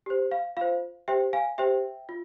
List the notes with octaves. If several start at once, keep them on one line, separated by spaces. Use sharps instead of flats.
G4 C5
F5
F4 C5 F5
G4 C5 E5 G5
F5 G#5
G4 C5 E5 G5
F4